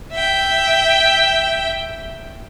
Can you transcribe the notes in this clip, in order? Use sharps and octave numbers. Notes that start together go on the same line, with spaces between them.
E5 G5